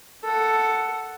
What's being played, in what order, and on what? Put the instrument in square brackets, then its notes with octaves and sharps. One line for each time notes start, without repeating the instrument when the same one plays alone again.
[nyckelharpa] A4 F#5